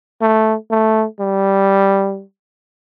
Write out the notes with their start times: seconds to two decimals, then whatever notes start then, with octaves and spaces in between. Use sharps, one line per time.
0.21 A3
0.71 A3
1.20 G3